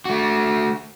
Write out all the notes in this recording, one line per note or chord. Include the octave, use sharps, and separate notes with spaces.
A3 F#4